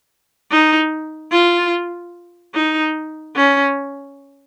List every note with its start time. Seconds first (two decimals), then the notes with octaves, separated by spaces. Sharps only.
0.51 D#4
1.32 F4
2.54 D#4
3.36 C#4